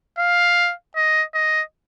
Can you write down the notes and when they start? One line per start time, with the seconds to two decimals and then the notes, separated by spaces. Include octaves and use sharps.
0.18 F5
0.96 D#5
1.34 D#5